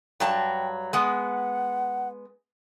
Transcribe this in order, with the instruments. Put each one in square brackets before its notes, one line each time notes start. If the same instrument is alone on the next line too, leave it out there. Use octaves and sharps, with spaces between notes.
[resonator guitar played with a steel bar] G2 F#3 A5 [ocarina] G5
[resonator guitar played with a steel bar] G#3 B3 [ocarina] F#5